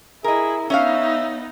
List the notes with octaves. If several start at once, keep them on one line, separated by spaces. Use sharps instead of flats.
E4 G#4 A#4 D#5
B3 C#4 D#4 C#5 E5 F5